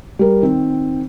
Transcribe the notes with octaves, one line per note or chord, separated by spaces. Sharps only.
G3 A#4
D#3 C4